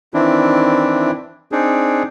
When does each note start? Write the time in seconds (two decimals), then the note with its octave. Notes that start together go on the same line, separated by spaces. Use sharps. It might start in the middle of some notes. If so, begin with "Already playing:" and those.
0.14 D#3 E3 C4 D4 E4
1.52 C4 D4 D#4 G#4